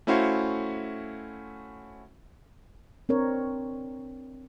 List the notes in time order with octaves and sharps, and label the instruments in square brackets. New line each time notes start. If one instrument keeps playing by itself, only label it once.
[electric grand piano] A3 C#4 E4 F#4 C5 F5
[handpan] C4 D4 A#4 C#5